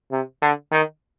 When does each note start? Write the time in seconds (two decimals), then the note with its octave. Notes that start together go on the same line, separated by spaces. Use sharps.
0.12 C3
0.42 D3
0.72 D#3